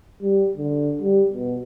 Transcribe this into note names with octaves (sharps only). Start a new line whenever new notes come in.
G3
D3
G3
B2